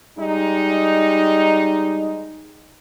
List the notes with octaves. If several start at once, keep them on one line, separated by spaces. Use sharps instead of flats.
G3 G#3 D#4